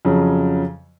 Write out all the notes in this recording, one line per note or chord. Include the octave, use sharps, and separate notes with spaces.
F2 C#3 F#3